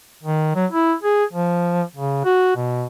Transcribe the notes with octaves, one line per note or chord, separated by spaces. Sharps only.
D#3
F#3
E4
G#4
F3
C#3
F#4
B2